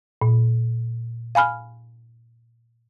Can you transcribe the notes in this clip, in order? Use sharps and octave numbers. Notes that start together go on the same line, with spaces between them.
A#2
F5 G#5 B5 F6